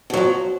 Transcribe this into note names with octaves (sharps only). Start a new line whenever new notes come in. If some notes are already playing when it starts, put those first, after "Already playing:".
B2 F3 F#3